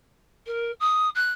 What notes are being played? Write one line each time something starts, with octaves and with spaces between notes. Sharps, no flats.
A#4
D#6
F#6